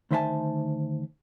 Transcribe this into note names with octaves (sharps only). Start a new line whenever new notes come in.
D2 D#3 C5 E5 G#5 A5